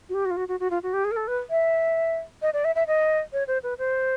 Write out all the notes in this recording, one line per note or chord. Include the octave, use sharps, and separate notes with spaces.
F#4
G4
F#4
F4
F#4
F#4
F#4
F4
F#4
G4
G#4
A#4
A4
B4
E5
D#5
D5
E5
E5
D#5
C#5
C5
B4
C5